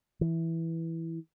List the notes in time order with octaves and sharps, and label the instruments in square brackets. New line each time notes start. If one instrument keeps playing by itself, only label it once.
[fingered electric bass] E3